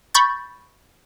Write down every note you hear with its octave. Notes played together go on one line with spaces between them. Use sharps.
B5 C#6 G6 A6